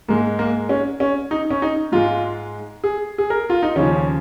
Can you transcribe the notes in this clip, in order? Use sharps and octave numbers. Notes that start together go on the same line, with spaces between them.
G#2 G#3 A#3
A#3
C#4
C#4
D#4
C#4
D#4
G#2 G#3 F4
G#4
G#4
A#4
F4
D#4
D#2 C#3 F3 C#4